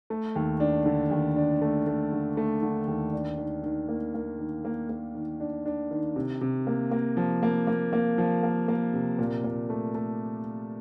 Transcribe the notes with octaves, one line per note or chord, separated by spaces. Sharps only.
A3
D#2
D4
D3
D#2
D4
A3
A3
D3
A3
D3
D#2
D4
D#3
D#3
A#3
A#3
D#3
A#3
A#3
D#3
D4
D4
D#3
C3
C3
A#3
A#3
F3
A#3
A#3
A#3
F3
A#3
A#3
C3
A#2
A#2
A3
A3